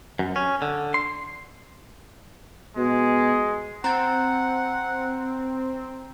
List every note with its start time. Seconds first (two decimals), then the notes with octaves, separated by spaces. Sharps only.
0.19 F#2
0.36 C#4
0.62 D3
0.94 C6
2.77 B2 G#3
3.84 C4 F#5 A#5 A6